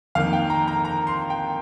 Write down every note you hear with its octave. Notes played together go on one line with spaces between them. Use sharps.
F2 D#3 A#3 F5
G5
A#5
A#5
A#5
C6
G5